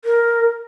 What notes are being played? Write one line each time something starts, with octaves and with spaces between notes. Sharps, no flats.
A#4